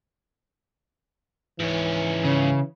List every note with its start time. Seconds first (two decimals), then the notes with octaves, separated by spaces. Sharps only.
1.60 G#2 E3 C#4
2.25 C#3